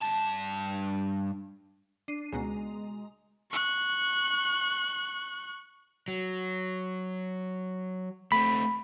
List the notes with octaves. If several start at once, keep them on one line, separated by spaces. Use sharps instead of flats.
G2 A5
D4 C7 D#7
C#2 B2 G#3 A#5
C#6 F#6
F#3
A3 C4 B5